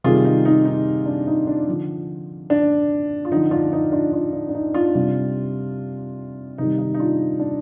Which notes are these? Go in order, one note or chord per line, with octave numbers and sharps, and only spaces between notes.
C3 D#3 G3 F4 G#4
D#4
D#4
D#4
D4
D#4
D4
D3 F3
D4
F4
D3 F3 D#4
D4 F4
D#4
D4 F4
D4 F4
D4
D4
D#4
D4 F4
C3 G3
C3 D#3 G3 D#4
D#4
D#4
D4 F4
D4